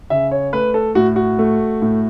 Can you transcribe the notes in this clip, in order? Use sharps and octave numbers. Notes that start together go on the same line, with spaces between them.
C#3 E5
C#5
A3 B4
A4
A2 F#4
F#4
A3
A2